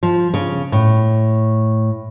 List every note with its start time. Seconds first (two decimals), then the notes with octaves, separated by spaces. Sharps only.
0.03 F3
0.34 C#3
0.72 A2